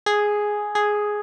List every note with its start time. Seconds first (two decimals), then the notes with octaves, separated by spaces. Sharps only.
0.06 G#4
0.75 G#4